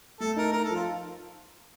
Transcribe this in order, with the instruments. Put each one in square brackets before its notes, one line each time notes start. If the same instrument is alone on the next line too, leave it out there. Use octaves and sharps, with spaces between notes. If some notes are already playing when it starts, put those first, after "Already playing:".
[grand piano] A3 [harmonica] A4
[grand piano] D#4 [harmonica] A#4
[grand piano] D#4 [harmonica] A#4
[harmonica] A4
[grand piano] F3
[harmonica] F4